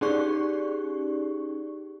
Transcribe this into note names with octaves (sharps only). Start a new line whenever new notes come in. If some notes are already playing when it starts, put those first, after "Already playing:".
C#4 D#4 G4 G#4 D5 C#6